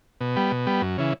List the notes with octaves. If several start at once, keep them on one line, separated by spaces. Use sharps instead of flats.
B2
G3 B3
B2
G3 B3
F#2
C#3 E3